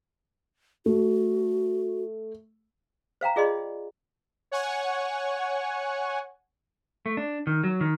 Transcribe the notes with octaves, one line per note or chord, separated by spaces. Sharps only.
A3 F#4
C5 F5 G5 A#5
F4 G#4 D5 D#5 C6
C#5 F#5 G#5 C#6
A3
D4
D#3
F#3
D#3